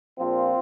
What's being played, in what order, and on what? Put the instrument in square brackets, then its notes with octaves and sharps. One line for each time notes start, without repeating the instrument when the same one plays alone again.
[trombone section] A#1 A#2 F3 C4 F4